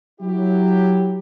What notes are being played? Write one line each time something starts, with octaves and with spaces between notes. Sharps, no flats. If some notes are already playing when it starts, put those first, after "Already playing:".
F#3 E4 G4